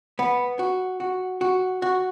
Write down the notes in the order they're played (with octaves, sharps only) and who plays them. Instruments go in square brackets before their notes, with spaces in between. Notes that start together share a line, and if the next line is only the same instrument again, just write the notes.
[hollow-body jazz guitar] B3
F#4
F#4
F#4
F#4